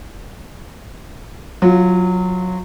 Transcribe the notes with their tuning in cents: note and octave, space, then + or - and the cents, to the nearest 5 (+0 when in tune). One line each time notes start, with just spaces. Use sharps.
F#3 -15 F4 +0